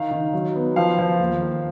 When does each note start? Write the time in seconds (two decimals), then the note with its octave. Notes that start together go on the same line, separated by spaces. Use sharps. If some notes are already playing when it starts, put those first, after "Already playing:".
Already playing: D#3 F5
0.11 D#3
0.33 F#3
0.55 B3
0.76 F3 F5
0.99 F3
1.20 D#2
1.42 D#2